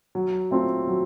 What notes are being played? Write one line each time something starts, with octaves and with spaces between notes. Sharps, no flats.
F#3
A3 C4 F4
F#3